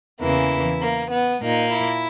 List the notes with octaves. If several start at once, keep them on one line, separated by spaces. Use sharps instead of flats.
E2 C#3 E3 A#3 E4
A#3
B3
A#2 A#3 D#4
E4